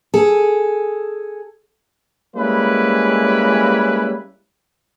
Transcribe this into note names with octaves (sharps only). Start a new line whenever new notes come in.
G#4 A4
G3 G#3 A#3 C#4 E4 B4